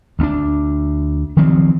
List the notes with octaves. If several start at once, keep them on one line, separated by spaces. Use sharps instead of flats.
D2 B3 D4
D#3 F3 F#3 C4